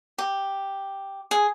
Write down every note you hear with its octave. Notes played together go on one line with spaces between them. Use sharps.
G4
G#4